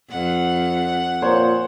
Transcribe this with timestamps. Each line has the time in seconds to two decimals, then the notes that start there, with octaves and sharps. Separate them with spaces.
0.10 F2 F#5
1.22 A#2 C5 C#5